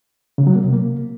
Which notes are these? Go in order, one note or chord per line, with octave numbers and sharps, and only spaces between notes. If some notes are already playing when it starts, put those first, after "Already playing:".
C#3
F#3
A#3
C3
A#3